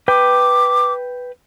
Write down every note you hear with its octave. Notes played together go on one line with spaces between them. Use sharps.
B4 G5 D6